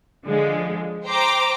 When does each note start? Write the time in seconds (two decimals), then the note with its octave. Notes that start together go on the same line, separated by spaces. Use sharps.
0.25 D3 F3 G#3
1.04 C5 G5 A#5 D6